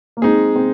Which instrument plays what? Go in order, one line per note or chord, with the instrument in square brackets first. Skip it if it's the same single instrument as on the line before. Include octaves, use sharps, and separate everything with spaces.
[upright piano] A#3
[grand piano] G#3 D#4 G#4 [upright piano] C4
[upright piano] C4